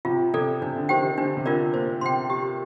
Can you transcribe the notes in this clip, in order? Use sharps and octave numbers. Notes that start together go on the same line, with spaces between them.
C3 F4
C3 A4 D5
C3 D4
D3
D#3 G4 C5 G5
D#3
D3 D4
C3
D3 F4 A#4 D5
A#2 C5
C3 G5 C6
G4